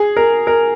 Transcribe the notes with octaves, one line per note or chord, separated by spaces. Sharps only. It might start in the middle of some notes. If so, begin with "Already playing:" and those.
Already playing: G#4
A#4
A#4